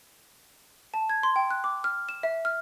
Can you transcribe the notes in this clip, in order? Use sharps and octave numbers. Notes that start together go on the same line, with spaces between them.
A5
G#6
C6
G5
F#6
D6
F6
E7
E5
F6